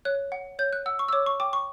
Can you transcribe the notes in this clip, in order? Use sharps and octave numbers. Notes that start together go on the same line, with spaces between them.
C#5 F#6
F#5
C#5 G6
F#6
F#5 E6
C#6
E6
C#5 D6
C#6
G5 D6
C#6